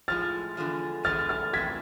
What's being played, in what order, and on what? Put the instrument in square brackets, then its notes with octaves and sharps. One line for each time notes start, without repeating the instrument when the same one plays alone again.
[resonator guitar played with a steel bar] A2 F3 G#3 [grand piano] F6 A6
[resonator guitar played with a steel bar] E2 D3 F3 G#3
[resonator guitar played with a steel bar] E2 D3 G#3 [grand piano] F6 A6
[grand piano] F6 A6
[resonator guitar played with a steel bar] F2 C3 E3 [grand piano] G#6 B6